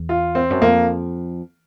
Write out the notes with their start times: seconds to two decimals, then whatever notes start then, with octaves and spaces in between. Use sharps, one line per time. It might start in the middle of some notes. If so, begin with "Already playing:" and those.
Already playing: E2
0.09 F4
0.35 C4
0.50 F#2
0.61 F2 A#3